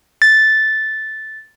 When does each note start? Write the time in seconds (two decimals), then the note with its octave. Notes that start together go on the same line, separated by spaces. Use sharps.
0.22 A6